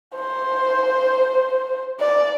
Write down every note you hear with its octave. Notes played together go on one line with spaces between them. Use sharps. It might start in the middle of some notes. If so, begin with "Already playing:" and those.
C5
D5